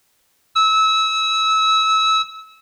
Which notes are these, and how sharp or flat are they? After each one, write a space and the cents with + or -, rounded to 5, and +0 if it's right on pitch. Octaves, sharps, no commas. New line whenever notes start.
E6 -25